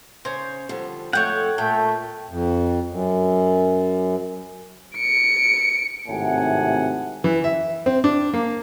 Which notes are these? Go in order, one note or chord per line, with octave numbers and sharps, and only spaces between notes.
C#3 C5 C#5
D3 F3 G3
F2 A3 C#5 F#5 G5 G6
A#2 A3 G5
F2
F#2
C#7 D7
G#1 A2 C3 F#5 G#5
E3
E5
C4
D4
A#3